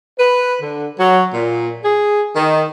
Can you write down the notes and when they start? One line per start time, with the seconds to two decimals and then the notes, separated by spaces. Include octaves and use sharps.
0.19 B4
0.61 D3
0.99 F#3
1.33 A#2
1.84 G#4
2.36 D#3